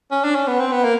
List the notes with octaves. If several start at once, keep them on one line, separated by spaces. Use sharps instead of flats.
C#4
D4
C#4
B3
C4
B3
A#3